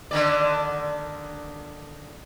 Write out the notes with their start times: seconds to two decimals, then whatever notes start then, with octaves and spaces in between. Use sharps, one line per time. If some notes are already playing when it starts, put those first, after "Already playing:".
0.11 D3 D#3 D5